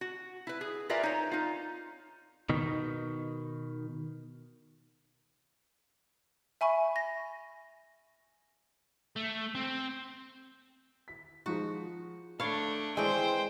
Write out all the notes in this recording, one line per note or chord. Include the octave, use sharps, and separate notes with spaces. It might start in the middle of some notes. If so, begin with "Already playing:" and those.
F#4
E4 B4
G#4
F4 A#4 B4 D5 E5 G#5
D#4 C#5
D#4 F4
B2 D#3
E5 G#5 B5 C#6
A#6
A3
C4
B6
F3 G#3 D#4 F#4
A3 D4 C#5 F5 B5
E3 G#3 C4 B4 C5 D5 G5